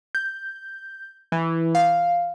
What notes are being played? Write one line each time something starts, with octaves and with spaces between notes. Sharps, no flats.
G6
E3
F5